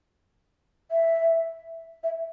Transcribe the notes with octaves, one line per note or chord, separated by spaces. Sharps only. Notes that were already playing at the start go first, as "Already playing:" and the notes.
E5
E5